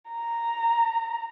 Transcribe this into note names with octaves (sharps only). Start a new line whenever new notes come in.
A#5